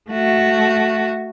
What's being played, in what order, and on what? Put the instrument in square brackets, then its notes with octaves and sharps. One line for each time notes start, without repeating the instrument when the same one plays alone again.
[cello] A3 F#4